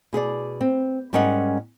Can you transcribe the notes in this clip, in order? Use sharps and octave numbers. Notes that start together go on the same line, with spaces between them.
B2 G#4 B4 D5
C4
G#2 G3 C#4 A#4 D#5 F#5